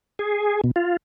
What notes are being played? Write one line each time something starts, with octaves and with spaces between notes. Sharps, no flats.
G#4
B2
F4